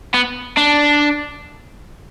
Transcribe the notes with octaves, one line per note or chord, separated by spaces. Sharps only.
B3
D4